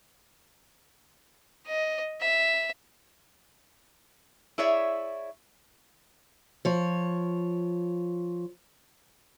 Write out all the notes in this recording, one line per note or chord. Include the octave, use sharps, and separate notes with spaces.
D#5
E5
E4 G#4 C#5 D5 E5
F3 C#5